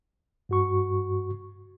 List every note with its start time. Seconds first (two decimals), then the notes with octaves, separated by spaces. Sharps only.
0.49 G2 F#4 C#6